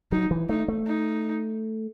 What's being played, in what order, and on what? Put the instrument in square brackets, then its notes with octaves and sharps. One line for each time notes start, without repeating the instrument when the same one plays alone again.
[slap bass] F#3 [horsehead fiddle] D#4
[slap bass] E3
[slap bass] A3 [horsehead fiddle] D#4
[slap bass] A3
[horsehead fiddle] D#4